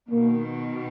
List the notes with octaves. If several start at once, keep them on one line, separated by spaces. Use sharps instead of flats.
B2 D#3 A#3